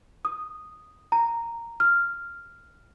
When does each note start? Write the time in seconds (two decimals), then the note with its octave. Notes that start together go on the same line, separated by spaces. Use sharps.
0.25 D#6
1.12 A#5
1.80 F6